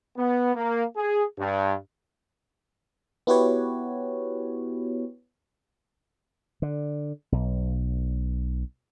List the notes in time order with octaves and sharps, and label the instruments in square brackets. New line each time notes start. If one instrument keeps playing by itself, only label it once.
[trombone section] B3
A#3
G#4
G2
[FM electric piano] B3 E4 F#4 G4 B4 C#5
[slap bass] D3
B1